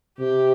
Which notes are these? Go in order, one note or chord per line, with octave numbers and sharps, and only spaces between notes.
C3 G4